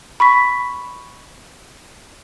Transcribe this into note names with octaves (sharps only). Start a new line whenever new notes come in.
B5 C#6 B6